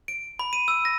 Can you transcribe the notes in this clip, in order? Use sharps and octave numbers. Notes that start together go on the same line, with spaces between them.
D7
B5
D#7
E6
A#6